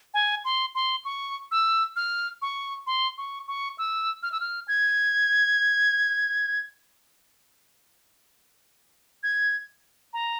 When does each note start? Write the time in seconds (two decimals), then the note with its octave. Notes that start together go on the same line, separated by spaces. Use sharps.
0.14 G#5
0.45 C6
0.75 C6
1.05 C#6
1.51 E6
1.96 F6
2.42 C#6
2.87 C6
3.18 C#6
3.48 C#6
3.78 E6
4.23 F6
4.32 E6
4.40 F6
4.68 G#6
9.23 G#6
10.13 A#5